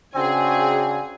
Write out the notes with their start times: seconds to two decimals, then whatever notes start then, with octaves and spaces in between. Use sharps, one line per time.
0.15 C#3 C4 D4 F#4 G#4 G#5